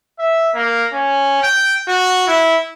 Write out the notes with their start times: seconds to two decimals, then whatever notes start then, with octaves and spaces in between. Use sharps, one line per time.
0.19 E5
0.55 A#3
0.93 C#4
1.43 G5
1.88 F#4
2.27 E4